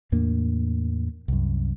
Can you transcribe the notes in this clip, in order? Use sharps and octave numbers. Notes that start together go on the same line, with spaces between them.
E2 A2 A#3 D4
C2 F#2